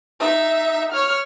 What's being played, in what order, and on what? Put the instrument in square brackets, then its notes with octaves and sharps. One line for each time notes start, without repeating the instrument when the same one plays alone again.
[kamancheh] D#4 E5
C#5 F6